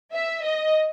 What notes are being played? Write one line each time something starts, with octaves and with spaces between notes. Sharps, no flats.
E5
D#5